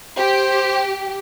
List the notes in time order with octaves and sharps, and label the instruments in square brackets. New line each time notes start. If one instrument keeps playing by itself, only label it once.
[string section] G4 [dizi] C5